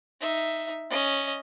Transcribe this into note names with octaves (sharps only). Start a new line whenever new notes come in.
D#4 E5
C#4 D#5